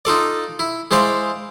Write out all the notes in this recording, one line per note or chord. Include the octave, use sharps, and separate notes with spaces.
D#4 F4 A4 D5
E4
G#3 E4 C5 D5 F5